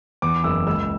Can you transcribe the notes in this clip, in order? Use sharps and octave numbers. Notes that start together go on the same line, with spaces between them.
E2 D6
F#1 E6
C#2 E6